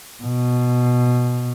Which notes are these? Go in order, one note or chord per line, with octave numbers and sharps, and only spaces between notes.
B2